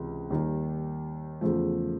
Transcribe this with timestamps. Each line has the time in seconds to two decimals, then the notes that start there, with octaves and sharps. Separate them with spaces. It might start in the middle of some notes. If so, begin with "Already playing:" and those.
Already playing: C#2 C3 E3
0.30 D#2 D#3 G3
1.41 E2 C#3 F3 A3